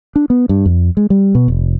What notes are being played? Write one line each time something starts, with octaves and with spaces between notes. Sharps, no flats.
D4
B3
G2
F2
G#3
G3
B2
F1